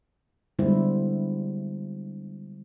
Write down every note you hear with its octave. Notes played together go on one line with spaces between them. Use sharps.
D3 G3 G#3 B3 E4 C5